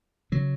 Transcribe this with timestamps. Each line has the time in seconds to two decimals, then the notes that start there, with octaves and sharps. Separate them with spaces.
0.32 C#3 F#3